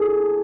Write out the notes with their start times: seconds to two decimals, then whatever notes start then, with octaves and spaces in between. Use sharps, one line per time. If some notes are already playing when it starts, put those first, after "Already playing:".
Already playing: G#4 A4